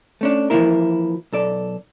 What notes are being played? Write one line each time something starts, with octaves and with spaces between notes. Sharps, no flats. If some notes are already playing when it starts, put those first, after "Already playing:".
A3 C#4 D4
E3 F3 A3 A#3 E4 A#4
B1 A4 D5